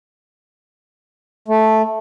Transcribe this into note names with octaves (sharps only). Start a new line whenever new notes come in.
A3